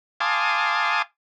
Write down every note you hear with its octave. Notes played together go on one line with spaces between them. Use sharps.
F5 G#5 A5 C6 D6 D#6